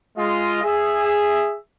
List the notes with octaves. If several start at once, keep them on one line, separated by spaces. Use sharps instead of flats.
G#3 F4 D#5
G#4 E5